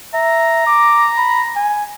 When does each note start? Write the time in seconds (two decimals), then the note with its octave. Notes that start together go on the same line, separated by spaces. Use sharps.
0.14 E5 A#5
0.67 D6
1.18 B5
1.56 G#5